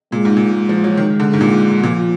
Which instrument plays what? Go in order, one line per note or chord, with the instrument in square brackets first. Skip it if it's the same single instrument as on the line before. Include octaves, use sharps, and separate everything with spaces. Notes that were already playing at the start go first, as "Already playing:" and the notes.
[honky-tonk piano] A#2 [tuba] G#3
[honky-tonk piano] G#2
A#2
[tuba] G#3
[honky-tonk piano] F3
F#3
D#3
D3
G#2
A#2
[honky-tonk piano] A#2 [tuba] F3